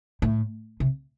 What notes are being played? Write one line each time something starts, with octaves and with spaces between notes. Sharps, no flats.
A2
C3